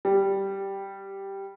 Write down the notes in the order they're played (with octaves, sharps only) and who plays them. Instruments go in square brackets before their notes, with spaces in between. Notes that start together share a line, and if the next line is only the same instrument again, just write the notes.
[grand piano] G3